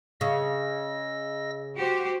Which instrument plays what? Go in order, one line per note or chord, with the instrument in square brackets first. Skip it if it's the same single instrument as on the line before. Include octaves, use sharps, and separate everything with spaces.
[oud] C#3 [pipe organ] D#5 E6 A#6
[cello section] F#4 G4 C5